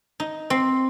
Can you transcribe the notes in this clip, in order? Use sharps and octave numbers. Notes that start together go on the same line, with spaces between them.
D#4
C4